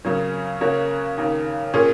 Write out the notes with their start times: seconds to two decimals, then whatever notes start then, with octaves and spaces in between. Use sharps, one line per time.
0.05 C#3 F#3 A#3 C#4
0.61 C#3 A#3 F#4 A#4 C#5
1.17 D#2 C#3 A#3
1.74 A#2 A#3 C#4 G#4